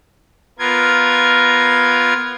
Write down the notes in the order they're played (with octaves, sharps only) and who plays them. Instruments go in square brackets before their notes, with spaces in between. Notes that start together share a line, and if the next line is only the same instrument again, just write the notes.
[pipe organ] B3 F4 A#4 G#6